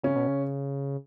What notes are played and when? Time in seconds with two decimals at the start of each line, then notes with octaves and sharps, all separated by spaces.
0.03 C#3 C#4
0.16 B2
0.27 C#3